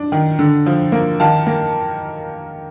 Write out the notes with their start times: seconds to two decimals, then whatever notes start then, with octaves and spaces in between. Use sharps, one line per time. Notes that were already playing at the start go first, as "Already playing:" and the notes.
Already playing: D4
0.12 D#3
0.39 D3
0.66 F3
0.92 A#3
1.20 D#3 F5 A5
1.47 A#3